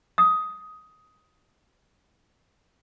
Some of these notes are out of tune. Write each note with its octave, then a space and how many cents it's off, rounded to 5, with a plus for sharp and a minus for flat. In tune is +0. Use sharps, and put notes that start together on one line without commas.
D#6 +10